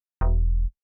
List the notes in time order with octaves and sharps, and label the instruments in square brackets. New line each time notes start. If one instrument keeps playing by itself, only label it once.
[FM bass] E1